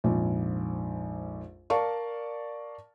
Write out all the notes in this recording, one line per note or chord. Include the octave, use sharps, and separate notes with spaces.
A#1 F2 G#2
A#4 D5 F5 A5 C#6